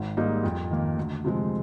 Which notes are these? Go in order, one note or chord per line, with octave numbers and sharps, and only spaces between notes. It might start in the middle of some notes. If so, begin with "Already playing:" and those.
Already playing: G#1
G#2 G3 A#3 D#4
F2
D#3 A#3
D2
C3 F3 G#3